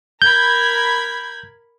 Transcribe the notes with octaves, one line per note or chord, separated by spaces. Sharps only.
A#4 B5 G6 G#6